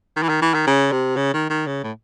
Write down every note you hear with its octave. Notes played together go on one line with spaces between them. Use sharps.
D#3
E3
D#3
E3
D#3
C#3
C3
C#3
D#3
D#3
C#3
A2